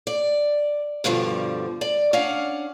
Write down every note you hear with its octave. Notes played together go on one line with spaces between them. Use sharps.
D5
G2 B2 D3 F3 G3
D5
C#4 D4 F5 F#5